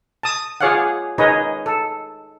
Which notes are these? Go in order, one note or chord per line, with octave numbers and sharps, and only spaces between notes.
A5 D#6
F4 G#4 C#5 D5 F5 F#5
D#4 G#4 A#4 B4 C#5 D#5
A4